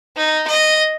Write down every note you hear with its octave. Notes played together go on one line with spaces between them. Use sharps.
D#4
D#5